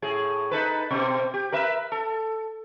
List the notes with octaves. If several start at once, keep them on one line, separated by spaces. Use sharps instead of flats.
A2 G#4
D#4 A4 B4
B2 C4
G4
A#4 B4 E5
A4